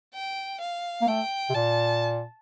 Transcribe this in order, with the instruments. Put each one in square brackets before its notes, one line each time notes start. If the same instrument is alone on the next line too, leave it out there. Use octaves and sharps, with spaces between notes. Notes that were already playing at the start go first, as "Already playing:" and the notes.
[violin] G5
F5
[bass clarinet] A#3
[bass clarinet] A3 [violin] G5
[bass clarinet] C3
[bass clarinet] A#2 [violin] A5